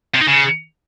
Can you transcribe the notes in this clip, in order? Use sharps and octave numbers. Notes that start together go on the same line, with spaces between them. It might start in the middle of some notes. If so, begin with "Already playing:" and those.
C3
D#4
C#3